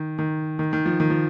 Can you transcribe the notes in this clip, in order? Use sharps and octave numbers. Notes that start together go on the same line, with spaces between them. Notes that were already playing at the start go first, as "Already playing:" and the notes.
Already playing: D#3
D#3
D#3
D#3
F3
D#3
F3